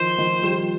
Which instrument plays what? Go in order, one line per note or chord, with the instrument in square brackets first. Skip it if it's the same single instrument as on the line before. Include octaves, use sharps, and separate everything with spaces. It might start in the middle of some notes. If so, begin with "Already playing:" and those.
Already playing: [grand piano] D#3 F3 [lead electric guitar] C5
[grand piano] D#3 F3
F3 G3